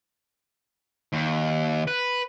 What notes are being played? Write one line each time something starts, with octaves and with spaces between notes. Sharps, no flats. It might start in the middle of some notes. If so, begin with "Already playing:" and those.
D#2
B4